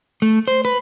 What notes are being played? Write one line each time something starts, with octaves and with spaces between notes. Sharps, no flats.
A3
C5
B4